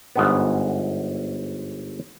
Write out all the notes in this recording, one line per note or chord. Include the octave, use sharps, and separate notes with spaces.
G1 G#2 B3